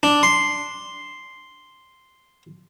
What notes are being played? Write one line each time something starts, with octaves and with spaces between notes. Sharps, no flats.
D4
C6